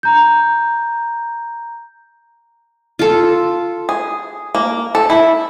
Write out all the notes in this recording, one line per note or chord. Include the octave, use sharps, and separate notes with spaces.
A#5 G6
F4 A4
G#4
A#3
A4
E4